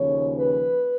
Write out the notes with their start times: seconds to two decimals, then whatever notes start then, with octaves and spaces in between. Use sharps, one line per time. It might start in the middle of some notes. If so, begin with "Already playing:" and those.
Already playing: D#2 C#3 F3 C#5
0.37 B4